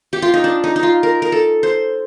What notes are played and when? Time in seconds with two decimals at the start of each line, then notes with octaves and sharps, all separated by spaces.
0.13 G4
0.22 F4
0.34 D#4
0.44 D4
0.64 D#4
0.76 D#4
0.83 F4
1.03 A#4
1.22 A#4
1.32 A4
1.63 C5